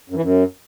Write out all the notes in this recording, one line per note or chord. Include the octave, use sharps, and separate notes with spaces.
F#2
E3
F#2